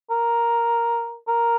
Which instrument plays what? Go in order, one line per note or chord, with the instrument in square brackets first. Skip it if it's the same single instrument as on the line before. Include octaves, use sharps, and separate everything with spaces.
[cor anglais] A#4
A#4